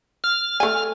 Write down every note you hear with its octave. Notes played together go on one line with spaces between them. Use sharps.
F6
A3 G#5